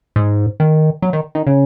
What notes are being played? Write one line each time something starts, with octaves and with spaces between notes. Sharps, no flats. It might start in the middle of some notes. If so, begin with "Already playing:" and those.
G#2
D#3
F#3
D#3
D#3
C#3